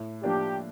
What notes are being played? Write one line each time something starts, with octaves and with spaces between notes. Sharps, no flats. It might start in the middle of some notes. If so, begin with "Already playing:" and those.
Already playing: A2
F3 A#3 D4 G4